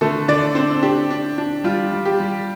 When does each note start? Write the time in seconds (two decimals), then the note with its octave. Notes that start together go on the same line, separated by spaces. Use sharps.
0.01 D3 A3 A4
0.28 D3 D4 D5
0.55 C4 D4 C5
0.82 D4 G4
1.11 D4
1.38 D4
1.64 G3 F4
1.92 G3
2.05 G4
2.20 G3